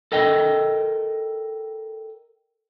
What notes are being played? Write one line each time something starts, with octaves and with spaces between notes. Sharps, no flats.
A4 A#4 D#5 G5